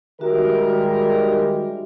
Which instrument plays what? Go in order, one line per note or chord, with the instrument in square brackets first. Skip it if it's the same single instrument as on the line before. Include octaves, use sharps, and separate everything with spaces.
[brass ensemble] D#3 G3 G#3 [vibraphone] F#4 E5 [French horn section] G4 A#4